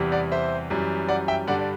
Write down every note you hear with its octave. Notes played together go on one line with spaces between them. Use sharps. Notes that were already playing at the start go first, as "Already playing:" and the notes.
Already playing: E2 C3 E3 G3
D5 F#5
C5 E5
F#2 E3 G3
D5 F#5
E5 G5
G2 D3 G3 D5 F#5
D5